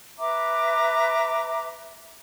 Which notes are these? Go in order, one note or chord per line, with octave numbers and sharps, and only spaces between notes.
B4 E5 A#5 D6